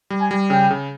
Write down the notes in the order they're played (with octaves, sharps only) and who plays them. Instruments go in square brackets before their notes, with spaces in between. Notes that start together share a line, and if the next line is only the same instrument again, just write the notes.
[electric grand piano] G3
[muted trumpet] G#5
[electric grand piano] G3
[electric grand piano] C#3 [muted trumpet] G5
[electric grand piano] C#3